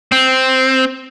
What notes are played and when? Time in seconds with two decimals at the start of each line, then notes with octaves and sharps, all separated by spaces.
0.12 C4